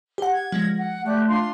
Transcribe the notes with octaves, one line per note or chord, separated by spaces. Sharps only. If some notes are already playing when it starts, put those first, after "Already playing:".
G4 F#5
G#6
F3 G#3 A#6
F#5
A3 G4 D5 F#6
D4 F4 C6